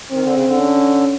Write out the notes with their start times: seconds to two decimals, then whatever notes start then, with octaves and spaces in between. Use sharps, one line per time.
0.11 D#3 C4
0.23 D3
0.34 C#3
0.46 D3
0.60 C#4